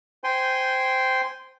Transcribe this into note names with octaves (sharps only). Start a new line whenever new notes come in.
C5 G5 G#5 C6